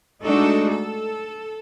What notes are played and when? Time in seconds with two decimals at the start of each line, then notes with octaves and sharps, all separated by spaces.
0.23 G#3 A3 D4 D#4 F#4 A4
0.69 A4